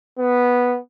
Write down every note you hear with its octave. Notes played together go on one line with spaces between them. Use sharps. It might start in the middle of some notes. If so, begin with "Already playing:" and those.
B3